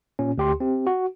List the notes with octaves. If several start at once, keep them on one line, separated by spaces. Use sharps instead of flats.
A#2 C#4
D2 G4 C6
C4 G4
F#4